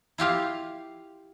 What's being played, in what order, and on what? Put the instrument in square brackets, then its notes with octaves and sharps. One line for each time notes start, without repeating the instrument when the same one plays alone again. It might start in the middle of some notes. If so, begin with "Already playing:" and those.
[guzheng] E4 F4 G4 F5